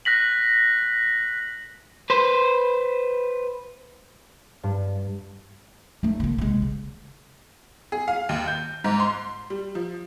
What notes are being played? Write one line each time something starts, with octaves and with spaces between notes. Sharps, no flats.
F#6 A#6 B6 F#7
B4 C5
G2
A3 D#4
C#3 A#3
C3 G#3
C#3
G#4
F5
D#2
G6
G#2
C6
G3
F3